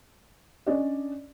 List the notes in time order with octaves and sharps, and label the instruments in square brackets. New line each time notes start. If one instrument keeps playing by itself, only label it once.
[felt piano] C#4 D4 D5 D#5